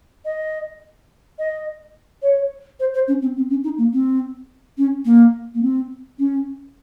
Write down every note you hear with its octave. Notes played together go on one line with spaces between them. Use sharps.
D#5
D#5
C#5
C5
C5
C#4
C4
C4
C#4
D#4
A#3
C4
C#4
A#3
A#3
C4
C#4